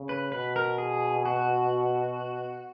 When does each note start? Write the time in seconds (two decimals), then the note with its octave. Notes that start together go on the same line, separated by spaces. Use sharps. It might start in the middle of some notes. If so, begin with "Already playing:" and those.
Already playing: C#3
0.09 B4
0.32 B2 B4
0.56 A#4
0.78 G#4
1.25 F#4